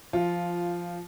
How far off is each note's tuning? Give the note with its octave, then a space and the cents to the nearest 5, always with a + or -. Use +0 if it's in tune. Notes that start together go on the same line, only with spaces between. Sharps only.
F3 -10 F4 +0